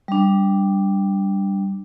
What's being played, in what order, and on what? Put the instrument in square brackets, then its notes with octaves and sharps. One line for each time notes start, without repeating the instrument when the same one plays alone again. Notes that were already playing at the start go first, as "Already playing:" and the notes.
[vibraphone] G3 D4